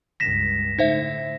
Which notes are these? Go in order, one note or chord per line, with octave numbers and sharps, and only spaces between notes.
C#2 G2 A#6 B6 E7
A2 D3 D#4 C5 E5